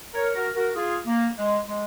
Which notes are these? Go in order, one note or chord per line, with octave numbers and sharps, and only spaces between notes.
A#4 C#5
F#4 A#4
F#4 A#4
F4 G#4
A#3
G#3
G#3